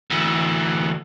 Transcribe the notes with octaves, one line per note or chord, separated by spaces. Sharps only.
D2 E3